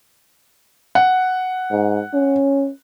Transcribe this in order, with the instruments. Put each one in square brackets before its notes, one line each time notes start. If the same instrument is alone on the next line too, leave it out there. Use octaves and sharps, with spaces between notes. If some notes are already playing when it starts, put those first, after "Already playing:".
[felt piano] F#5
[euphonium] G#2
C#4